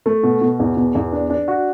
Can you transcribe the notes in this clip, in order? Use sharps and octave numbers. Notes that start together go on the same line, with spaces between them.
A3
B2
B2
E2
B2
E2
D4
D4
F#4